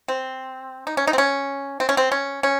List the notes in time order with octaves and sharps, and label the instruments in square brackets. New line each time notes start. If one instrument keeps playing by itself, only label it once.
[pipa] C4
D#4
C#4
D#4
C4
C#4
C4
C#4
C4
C#4
C#4